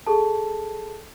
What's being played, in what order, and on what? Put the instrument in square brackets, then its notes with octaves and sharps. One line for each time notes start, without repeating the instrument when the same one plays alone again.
[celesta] G#4 A4 A5